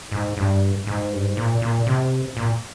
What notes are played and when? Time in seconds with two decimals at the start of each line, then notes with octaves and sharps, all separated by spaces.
0.12 G#2
0.37 G2
0.87 G#2
1.12 G2
1.25 G#2
1.37 A#2
1.62 A#2
1.87 C3
2.37 A#2